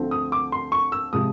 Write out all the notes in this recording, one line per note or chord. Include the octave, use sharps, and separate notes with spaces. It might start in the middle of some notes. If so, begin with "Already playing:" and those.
Already playing: D2 D3 F3 A3 C4
D#6
D6
C6
C#6
E6
C3 F3 G#3 D#6